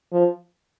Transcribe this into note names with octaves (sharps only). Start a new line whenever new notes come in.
F3